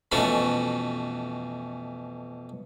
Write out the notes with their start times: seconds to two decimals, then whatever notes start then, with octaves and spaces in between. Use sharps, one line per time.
0.12 F2 B2 E3 A3 C#4 F#4